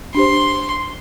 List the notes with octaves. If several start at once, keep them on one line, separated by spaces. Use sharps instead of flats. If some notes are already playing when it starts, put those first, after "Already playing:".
D4 G4 C5 C6